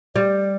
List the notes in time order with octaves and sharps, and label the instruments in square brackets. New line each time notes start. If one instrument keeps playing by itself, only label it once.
[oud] G3 [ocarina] D5